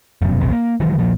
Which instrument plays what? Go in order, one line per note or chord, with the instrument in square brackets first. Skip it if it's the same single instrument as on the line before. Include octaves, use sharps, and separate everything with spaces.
[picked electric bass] F1 F#2 B2
E1 A#1 C3
A#3
D#3 E3 F#3 G#3
D#1 A#2 F3